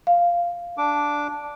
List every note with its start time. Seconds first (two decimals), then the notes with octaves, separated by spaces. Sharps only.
0.07 F5
0.78 D4 D6